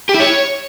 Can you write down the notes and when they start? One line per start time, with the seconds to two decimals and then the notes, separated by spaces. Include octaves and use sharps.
0.09 G4
0.14 E4
0.20 C#5